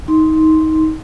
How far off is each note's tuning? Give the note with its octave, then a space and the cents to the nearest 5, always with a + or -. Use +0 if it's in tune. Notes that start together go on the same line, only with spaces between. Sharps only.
D#4 +20 C6 +0